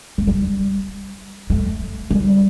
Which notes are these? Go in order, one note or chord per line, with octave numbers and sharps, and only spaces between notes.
A3
G3
A3
G3